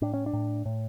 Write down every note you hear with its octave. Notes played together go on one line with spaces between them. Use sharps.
A2 D4
C#4
D4
A2
A2